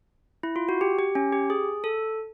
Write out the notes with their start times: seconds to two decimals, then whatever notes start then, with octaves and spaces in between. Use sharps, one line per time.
0.43 E4
0.56 F4
0.69 F#4
0.81 G4
0.99 G4
1.15 C#4
1.33 G4
1.50 G#4
1.84 A4